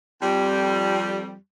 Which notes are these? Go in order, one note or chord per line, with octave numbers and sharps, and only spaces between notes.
F2 G3